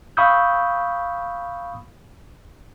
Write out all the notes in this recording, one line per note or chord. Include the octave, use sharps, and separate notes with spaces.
F5 B5 C#6 D#6 E6 G6